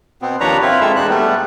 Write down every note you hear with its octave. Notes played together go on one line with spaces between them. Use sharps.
B2 B3 C4
D#2 F3 D4 B4 C#5 A#5
C4 E4 F4 B4
G#3 C4 A4 E5
E2 B2 G#3 D4 D#4 F#6
G3 A3 B3